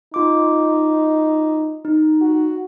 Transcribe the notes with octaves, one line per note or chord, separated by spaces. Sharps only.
D#4 F4 D6
D#4
F#4